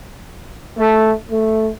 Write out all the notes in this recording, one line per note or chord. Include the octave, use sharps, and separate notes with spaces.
A3
A3